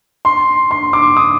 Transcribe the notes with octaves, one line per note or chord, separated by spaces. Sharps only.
C6
C6
D6
D#6